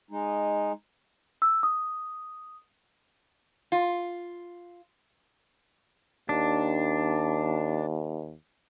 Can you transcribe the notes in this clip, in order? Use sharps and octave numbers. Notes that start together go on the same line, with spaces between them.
G#3 D#4
E6
D#6
F4
D#2 D4